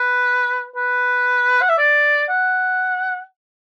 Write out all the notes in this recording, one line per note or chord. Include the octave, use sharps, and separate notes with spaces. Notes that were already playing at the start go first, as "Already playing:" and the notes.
Already playing: B4
B4
F#5
E5
D5
F#5